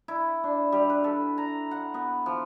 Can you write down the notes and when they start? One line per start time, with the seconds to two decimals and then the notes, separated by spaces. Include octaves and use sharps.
0.08 E4
0.44 D4
0.72 G3
0.90 B4
1.04 A4
1.38 A#5
1.71 F#5
1.94 B3
2.26 F3